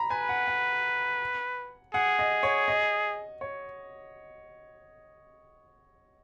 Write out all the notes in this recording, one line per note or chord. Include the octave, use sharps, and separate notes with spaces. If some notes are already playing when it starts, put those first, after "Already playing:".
Already playing: A#5 B5
B4 G#5
F#5
F#5
G#4 F#5
D#5
C#5
D#5
C#5